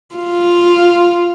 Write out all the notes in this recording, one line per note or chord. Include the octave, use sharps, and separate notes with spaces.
F4